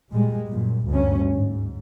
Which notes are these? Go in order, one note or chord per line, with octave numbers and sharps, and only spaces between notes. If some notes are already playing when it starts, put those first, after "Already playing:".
A#2 G3 G#3
F#2 A#2
D2 G2 C#4
G#2